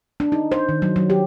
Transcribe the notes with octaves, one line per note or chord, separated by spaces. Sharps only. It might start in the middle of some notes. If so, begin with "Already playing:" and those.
D4
D#4
C5
D#3
F#3
F#3
G4